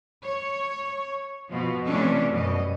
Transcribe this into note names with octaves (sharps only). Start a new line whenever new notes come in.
C#5
B2 F3
C3 E3 A3 C#4 D4 A4
F#2 B2 G3 D#5